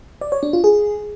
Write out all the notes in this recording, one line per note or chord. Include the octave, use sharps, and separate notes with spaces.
D5
C#5
D4
F4
G#4